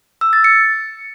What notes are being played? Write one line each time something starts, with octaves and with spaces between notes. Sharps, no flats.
E6
A6
C#7